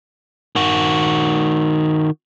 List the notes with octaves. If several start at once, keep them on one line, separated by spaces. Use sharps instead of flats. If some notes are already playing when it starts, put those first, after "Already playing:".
D#3 F#4